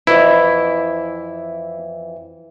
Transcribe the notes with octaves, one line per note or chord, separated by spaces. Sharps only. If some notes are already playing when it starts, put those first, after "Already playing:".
F2 E3 E4